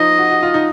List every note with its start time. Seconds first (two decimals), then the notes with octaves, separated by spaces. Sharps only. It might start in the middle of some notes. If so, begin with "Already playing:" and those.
Already playing: F3 D#4 D#5
0.18 F#4
0.30 F#4
0.43 F4
0.54 D#4